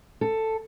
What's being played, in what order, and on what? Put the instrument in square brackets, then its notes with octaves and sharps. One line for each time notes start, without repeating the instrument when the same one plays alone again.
[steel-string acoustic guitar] A4